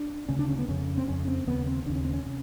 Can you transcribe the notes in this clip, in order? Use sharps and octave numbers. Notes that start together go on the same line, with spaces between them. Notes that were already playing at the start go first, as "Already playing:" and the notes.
Already playing: D4
D2 C#3 C#4
D4
C#4
B3
F2 C#3 C#4
C4
F2 C#3 C#4
C4
D#2 C#3 B3
C4
D#2 C#3 D4
C#4
C4
C#4
C3